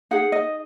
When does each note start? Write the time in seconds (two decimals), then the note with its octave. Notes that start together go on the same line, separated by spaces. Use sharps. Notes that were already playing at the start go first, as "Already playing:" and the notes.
0.11 D#4 G#4 F#5
0.32 D#5